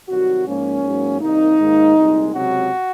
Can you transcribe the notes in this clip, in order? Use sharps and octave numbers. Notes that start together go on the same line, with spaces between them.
C2 C3 D#3 F#3 F#4
G#2 F3 A#3 C#4
G#2 F#3 A#3
C2 C3 D#3 A#3 D#4
G#2 D#3 A#3
C2 A#2 G#3
C#2 C3 F#3 F#4